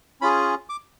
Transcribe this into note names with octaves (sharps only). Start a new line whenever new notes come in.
C#4 F4 G#4 B5
D6